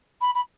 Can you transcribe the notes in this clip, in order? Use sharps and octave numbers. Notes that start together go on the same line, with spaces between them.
B5
B5